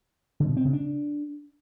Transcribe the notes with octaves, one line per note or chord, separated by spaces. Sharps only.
D3
B2
C4
C#3
D4